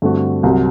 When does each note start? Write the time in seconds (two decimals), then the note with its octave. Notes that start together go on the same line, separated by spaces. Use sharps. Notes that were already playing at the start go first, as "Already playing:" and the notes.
0.02 G2 D3 A3 C4 F#4
0.43 C2 C3 F#3